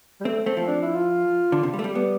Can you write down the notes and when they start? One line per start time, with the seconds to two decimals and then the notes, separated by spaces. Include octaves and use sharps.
0.21 G3
0.25 A3 C4
0.46 A3 C4
0.57 F3
0.67 D4
0.82 E4
0.95 F4
1.52 D3
1.63 C3
1.74 G3
1.79 A3
1.84 G3
1.95 G3 B3